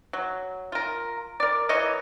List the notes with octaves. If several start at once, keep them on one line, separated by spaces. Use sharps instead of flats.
F#3
F4 A#4
A#4 D5
E3 A#3 C#5 D#5